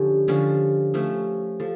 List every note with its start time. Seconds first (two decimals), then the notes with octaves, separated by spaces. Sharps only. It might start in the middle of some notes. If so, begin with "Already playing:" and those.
Already playing: D3 F3 C#4 F4 G4
0.28 D3 F3 C#4 F4
0.94 F3 A3 C#4
1.60 F3 A4